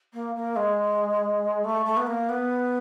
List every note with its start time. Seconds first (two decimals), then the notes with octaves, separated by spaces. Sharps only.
0.13 A#3
0.35 A#3
0.56 G#3
1.64 A3
1.85 A3
1.97 B3
2.06 A#3
2.29 B3